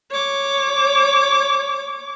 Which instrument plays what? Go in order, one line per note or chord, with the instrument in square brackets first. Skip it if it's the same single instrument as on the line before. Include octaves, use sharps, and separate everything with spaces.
[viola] C#5 D6